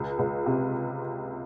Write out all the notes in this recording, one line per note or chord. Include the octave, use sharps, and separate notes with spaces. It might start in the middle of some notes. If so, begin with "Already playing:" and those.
Already playing: C#2
C#2
C3